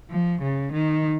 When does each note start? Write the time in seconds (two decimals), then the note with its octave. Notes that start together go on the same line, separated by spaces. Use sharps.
0.11 F3
0.42 C#3
0.73 D#3